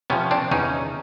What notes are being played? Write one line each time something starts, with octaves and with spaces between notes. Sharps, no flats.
C3 F3 B3 C#4
C4 D4
E2 C#4 D#4